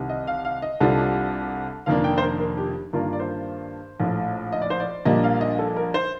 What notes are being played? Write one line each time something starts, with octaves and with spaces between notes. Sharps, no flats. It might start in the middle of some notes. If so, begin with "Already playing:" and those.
Already playing: C2 C3 D#3
D#5
F5
F5
D#5
C2 C3 G3 D4 F4 A4
F1 F2 D#3 A#3 D4 F5
G5
C5
A#4
A#4
G4
G2 D#3 A#3 D4 F4 A#4
D5
C5
A#1 A2 A3
D#5
D5
C5
D5
A#1 A#2 G3 A#3 D4 D#5
F5
D#5
A4
A#4
C5